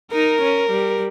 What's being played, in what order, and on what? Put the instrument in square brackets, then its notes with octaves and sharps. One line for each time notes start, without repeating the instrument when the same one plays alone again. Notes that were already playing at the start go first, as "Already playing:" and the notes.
[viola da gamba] D#4 [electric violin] A#4
[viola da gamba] C#4
G3